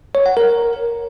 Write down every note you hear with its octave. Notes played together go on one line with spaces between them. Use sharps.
C#5
F#5
A#4